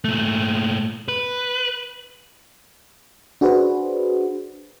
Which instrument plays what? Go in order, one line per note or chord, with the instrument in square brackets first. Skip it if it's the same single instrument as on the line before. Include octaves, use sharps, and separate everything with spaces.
[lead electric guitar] A#2 A3
B4
[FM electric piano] D4 F#4 G#4 B4 C5